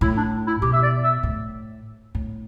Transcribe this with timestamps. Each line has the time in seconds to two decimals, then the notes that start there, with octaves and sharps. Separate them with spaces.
0.01 A2 E4
0.17 D4
0.47 E4
0.62 B2 G4
0.73 E5
0.83 D5
1.03 E5
1.23 A2
2.15 A2